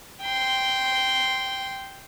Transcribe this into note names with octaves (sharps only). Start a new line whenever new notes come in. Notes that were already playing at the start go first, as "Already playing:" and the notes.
G5 C6